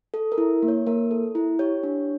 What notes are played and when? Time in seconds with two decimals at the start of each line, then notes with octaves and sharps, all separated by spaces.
0.14 A4
0.32 A#4
0.38 E4
0.63 A#3
0.68 C#5
0.87 A#3 A#4
1.11 A4
1.35 E4
1.59 G4 C#5
1.83 D4